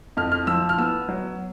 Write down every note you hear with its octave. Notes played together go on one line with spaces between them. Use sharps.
F2 F6
F6
F3 E6
F6
B3 E6
F#3